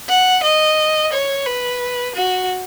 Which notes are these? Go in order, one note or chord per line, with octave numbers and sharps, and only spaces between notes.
F#5
D#5
C#5
B4
F#4